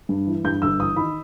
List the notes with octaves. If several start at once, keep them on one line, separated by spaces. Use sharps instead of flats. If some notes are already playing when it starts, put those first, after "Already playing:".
G2
E3
G2 G6
G1 E6
E3 D#6
D#3 B5